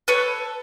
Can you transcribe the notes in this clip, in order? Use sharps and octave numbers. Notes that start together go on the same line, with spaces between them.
A4 B4 C#5